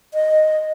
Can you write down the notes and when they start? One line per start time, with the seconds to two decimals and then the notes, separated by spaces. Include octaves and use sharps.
0.14 D#5